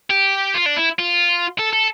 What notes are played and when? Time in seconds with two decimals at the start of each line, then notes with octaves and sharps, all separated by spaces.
0.10 G4
0.54 F4
0.66 D4
0.77 E4
0.99 F4
1.59 A4
1.73 A4